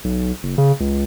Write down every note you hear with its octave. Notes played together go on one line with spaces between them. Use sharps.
B1
F#1
C#3
C#2